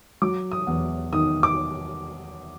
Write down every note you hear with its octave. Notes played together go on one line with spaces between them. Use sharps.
F#3 D6
D#6
E2
D#3 D#6
D6